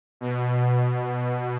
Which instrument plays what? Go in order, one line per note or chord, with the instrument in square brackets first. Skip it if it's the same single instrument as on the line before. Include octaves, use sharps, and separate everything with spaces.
[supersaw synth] B2